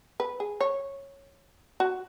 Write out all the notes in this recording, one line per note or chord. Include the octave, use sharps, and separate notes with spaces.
B4
G#4
C#5
F#4